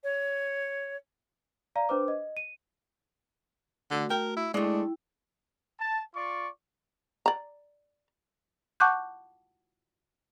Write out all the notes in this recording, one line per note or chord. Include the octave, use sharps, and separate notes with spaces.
C#5
D5 F5 A#5
D4 B4 C5 D6
D#5
D#7
D3 A3 F#4
A#4 G5
E4
G#3 A3 D4 E4 G5
A5
F4 D5 C#6
D5 A#5
F#5 A5 C#6 D6 F#6 G6